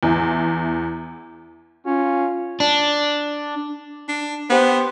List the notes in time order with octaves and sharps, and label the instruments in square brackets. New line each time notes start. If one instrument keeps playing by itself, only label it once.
[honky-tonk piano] E2 E4
[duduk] C#4 [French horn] F4
[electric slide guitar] D4
[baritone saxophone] D4
[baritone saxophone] B3 [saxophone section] G4 C5